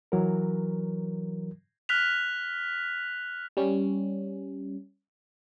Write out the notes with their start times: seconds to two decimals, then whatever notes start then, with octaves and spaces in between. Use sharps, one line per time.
0.12 E3 F#3 A#4
1.89 F6 F#6 B6 F7
3.57 G3 C#4